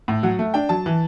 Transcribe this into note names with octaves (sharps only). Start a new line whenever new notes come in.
A2
F#3 F#5
A3
D4 G5
F#3 A5
E3